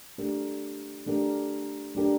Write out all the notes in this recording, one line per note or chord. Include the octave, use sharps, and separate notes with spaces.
A3 D4 G4 A#4
A3 D4 G4 A#4
A3 D4 G4 A#4